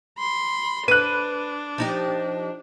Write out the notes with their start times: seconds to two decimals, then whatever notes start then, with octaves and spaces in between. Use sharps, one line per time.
0.18 B5 C6
0.88 D4 B4 F#6 D#7
1.78 F3 D#4 G4